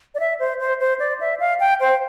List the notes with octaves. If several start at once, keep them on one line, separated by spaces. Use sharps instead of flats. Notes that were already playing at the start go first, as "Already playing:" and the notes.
D5
E5
C5
C5
C5
D5
E5
F5
G5
C5